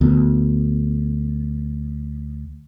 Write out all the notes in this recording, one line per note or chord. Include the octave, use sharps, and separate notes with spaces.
D2 B3